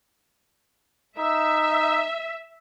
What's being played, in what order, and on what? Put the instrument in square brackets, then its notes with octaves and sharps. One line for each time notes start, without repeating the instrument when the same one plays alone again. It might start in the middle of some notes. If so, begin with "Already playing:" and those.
[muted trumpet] D#4 [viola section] E5